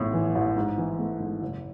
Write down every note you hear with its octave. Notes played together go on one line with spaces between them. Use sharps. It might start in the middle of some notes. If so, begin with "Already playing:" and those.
Already playing: A1 A2
E3
A1
G#2
E3
A3
G#2
F#1